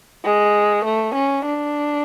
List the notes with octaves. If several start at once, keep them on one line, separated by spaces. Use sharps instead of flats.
G#3
A3
C#4
D4